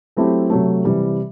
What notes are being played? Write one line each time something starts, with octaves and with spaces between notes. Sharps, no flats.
F#3 A3 C4 E4 G4
C3 F#3 A3
C3 E3 G3